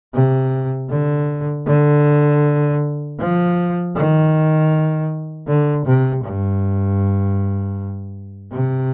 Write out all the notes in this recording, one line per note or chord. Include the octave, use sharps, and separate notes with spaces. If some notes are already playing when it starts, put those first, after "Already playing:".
C3
D3
D3
F3
D#3
D3
C3
G2
C3